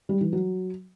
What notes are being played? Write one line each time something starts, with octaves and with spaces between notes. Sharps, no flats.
G3
E3
F#3